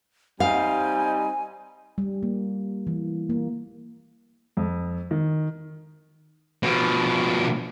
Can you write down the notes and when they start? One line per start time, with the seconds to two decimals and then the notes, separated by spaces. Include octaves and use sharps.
0.40 G3 C4 D#4 F5 G#5
1.98 G3
2.23 A#3
2.87 E3
3.30 A#3
4.57 F2
5.11 D#3
6.63 B2 F3